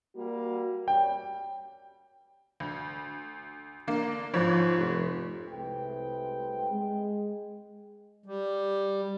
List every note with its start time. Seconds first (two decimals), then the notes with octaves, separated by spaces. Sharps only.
0.15 G3 A#3 F#4
0.88 G3 C#4 G5
2.60 D2
3.87 D3 A#3
4.34 G1 G#2 F3 C#5
4.77 F1
5.48 C2 C3 G#3 A3 B4 G5
6.71 G#3
8.26 G3